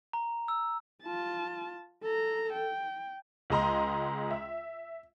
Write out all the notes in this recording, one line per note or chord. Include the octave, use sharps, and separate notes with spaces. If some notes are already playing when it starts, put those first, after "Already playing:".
A#5
E6
F4 A5
A4 A#5
G5
C#2 G#3 D#5 A#5 C6
E5